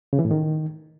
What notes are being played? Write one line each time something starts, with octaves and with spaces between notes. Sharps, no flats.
C#3
E3
A2
D#3